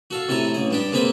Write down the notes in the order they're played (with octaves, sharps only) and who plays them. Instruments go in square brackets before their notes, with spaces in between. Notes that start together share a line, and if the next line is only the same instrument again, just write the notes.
[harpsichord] F#4 A4 F5
A2 C3 A4 G#5 A#5
A1 G#4
G2 D4 G4
G#3 A#3 C4 G#4 B4 C5